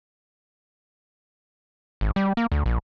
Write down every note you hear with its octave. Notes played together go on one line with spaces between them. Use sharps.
G#1
G3
A#3
D2
A#1